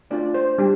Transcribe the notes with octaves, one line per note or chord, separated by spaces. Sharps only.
A3 D4 F4 D5
C5
G3 D4 G4